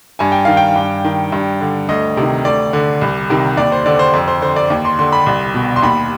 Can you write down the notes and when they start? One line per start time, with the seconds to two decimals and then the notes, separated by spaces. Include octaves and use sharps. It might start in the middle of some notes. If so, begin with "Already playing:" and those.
0.19 G2 G#5
0.32 G5
0.45 D#3 F5
0.57 G5
0.76 G2
1.05 D#3
1.32 G2
1.61 D3
1.89 D2 D#5
2.17 C3 D#3
2.45 D2 D5
2.73 D3
3.01 C2
3.30 C3 D#3
3.57 D#2 D5
3.72 C5
3.86 D3 D5
3.99 C5
4.13 F2
4.28 C5
4.42 D3 C5
4.56 D5
4.70 D#2
4.85 C6
4.99 D3 C6
5.12 B5
5.26 C2
5.54 B2
5.76 C6
5.82 D#2 B5